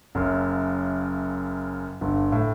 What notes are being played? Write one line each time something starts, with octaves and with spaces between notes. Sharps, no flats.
F#1 F#2
G1 G2
A2